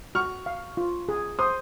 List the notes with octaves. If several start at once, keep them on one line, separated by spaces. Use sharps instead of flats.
F#4 C#6 F6
F5
F4
G#4
C5 C6 D#6